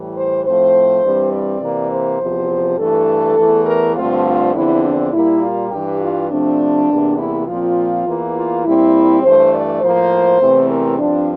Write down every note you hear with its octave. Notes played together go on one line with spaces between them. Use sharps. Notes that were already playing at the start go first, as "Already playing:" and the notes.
Already playing: A2 E3 G3
C5
A2 F3 A3 C4 C5
G2 E3 G3 C4
D5
C3 E3 A#3
C5
E2 C3 F3
G2 E3 A3 A4
E2 E3 A3
A#4
G2 D3 F3 A3 C4 F4
F4
E2 D3 F3 C4 E4
D4
A#2 G3 A#3 E4
F4
G2 E3 G3 G4
F4
C3 F3 A3 C4 D4
E2 C3 E3 A#3
E4
A#2 F3 C4 F4
E2 E3 A#3
F4
A#2 G3 C4 E4
G2 E3 A3 C5
D5
A2 F3 A#3 C5
E2 C3 E3 A3 C4
A#4
G2 F3 C4 D4